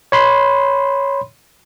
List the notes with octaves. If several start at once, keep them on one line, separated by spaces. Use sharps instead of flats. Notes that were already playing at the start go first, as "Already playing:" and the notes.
C#5 B5 C6